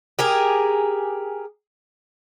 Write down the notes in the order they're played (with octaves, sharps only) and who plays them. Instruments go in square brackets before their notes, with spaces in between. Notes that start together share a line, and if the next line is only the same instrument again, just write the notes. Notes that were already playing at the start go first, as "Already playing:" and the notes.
[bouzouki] G4 G#4 A#4